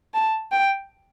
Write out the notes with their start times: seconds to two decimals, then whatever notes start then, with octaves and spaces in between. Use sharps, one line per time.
0.14 A5
0.52 G5